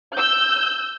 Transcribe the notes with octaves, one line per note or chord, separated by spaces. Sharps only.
E6 G6